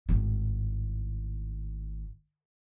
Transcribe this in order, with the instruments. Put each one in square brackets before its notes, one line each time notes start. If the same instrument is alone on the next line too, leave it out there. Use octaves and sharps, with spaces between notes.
[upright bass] G#1 A2